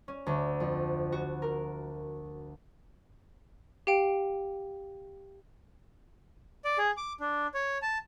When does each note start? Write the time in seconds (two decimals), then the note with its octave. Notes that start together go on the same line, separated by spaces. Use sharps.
0.08 C#4
0.27 D2
0.60 F2
1.12 F#4
1.42 A#4
3.87 G4 F5 G5 D7
6.65 D5
6.78 G#4
6.97 D6
7.20 D4
7.54 C#5
7.82 A5